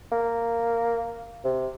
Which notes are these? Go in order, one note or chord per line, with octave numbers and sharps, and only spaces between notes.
A#3
C3